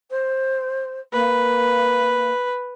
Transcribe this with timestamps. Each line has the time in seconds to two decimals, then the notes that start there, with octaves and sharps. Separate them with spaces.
0.11 C5
1.13 A#3 B4